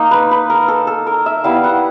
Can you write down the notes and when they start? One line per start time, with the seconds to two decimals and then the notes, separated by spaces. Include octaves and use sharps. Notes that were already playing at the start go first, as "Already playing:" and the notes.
Already playing: A#3 D#4
0.11 B4
0.31 B4
0.50 A#4
0.68 A4
0.87 A4
1.07 A#4
1.26 E5
1.44 G3 B3 E4 F5
1.64 F#5